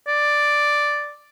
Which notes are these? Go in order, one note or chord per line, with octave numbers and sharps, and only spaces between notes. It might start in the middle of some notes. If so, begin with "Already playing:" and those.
D5